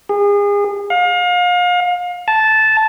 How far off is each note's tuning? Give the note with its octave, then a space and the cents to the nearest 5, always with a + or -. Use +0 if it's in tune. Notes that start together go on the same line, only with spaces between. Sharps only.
G#4 -35
F5 +35
A5 -10